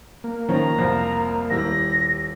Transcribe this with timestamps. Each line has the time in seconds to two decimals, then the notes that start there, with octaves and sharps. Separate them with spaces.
0.24 A#3
0.49 D#3 F3 C#4 A#5
0.78 C2 F2 F3
1.50 D#1 G3 E4 A#6